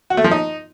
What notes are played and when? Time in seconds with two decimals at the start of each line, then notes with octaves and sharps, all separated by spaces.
0.10 F#4
0.17 A3
0.24 F3
0.31 D#4